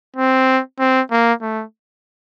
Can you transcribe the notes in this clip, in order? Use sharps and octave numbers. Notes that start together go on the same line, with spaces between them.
C4
C4
A#3
A3